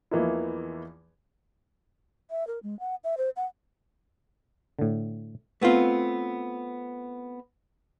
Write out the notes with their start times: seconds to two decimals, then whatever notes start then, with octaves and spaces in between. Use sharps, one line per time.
0.11 E2 E3 F3 A#3 D#4 E4
2.31 E5
2.47 A#4
2.63 G#3
2.80 F#5
3.04 E5
3.18 C5
3.37 F#5
4.79 A2 D3
5.61 A3 B3 C4 F4